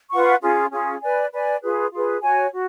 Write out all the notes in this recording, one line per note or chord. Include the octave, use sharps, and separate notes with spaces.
F4 B4 F#5 C#6
C#4 F4 G#4
C#4 F4 G#4
B4 D5 G#5
B4 D5 G#5
F4 G#4 B4
F4 G#4 B4
F#4 C#5 G#5
F#4